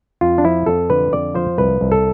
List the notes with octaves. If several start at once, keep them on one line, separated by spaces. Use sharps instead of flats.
F2 F4
D4
F3 E4
F2 A4
D3 B4
F2 D5
F3 C5
C2 B4
C2
A4